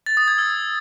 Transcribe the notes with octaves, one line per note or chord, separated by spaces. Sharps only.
A6
D#6
G#6
E6